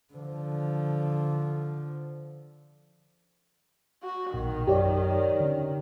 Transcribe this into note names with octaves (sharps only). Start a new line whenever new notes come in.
D3 F3
F#4
A#1 B2 D#3
F#2 G4 C#5 D5
D3 C#4